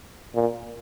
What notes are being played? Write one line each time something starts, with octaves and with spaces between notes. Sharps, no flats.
A#2